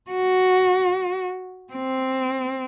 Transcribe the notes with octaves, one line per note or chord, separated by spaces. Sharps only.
F#4
C4